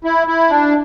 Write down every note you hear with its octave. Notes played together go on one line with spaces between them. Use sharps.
E4
E4
D4